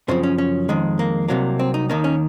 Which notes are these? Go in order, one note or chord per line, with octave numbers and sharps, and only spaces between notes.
F#2 C#3 F3 C4
C#4
C#4
F2 D#3 G#3
A#3
C2 C3 F#3 A#3
C4
D#4
D#2 D#3 A#3 D#4
C#4